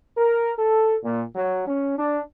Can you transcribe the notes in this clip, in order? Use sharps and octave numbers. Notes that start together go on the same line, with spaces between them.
A#4
A4
A#2
F#3
C#4
D4